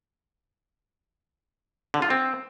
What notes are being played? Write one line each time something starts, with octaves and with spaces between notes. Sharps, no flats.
D3
F4
C4